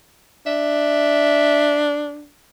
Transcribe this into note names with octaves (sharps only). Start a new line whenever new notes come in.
D4 E5